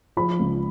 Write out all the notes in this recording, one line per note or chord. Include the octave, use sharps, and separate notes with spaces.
F3 B5
C#2